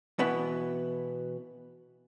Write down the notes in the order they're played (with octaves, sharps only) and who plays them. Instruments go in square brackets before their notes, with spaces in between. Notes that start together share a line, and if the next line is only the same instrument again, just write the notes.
[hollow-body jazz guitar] B2 E3 B3